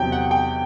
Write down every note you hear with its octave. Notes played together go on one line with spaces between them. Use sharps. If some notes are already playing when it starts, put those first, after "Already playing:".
Already playing: E2 C3 F#3 G5
F#5
G5